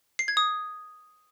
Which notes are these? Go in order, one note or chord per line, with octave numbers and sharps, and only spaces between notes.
C7
G#6
D#6